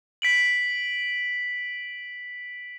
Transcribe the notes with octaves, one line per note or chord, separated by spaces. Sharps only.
B6 D7 F#7